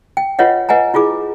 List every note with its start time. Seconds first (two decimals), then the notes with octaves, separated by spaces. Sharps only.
0.17 G5
0.39 F4 B4 C#5 D#5 F#5
0.69 B4 D#5 F#5 G#5 A#5
0.94 E4 F4 G#4 D6